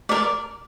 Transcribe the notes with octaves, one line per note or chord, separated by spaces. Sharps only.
A#4 D5